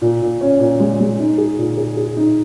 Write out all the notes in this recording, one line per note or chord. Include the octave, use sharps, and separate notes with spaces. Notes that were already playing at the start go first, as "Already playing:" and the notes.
A#2
A#2
C#4
A#2
G#3
G#3
D#4
G#4
A#2
G#4
G#4
D#4